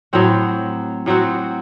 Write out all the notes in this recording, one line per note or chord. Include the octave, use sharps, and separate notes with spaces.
A2 F#3 C4 F#4
A2 F#3 C4 F#4